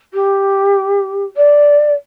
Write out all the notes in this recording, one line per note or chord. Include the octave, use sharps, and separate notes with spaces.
G4
D5